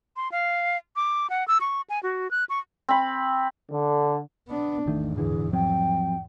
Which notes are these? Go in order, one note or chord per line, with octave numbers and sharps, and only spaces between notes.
C6
F5
D6
F#5
E6
C#6
G#5
F#4
F#6
C#6
C4 B5
D3
B3 D4
G#1 E2 G#2 D#3 A3
D#1 D3 E3 G#4
F3 F#3 C4 G5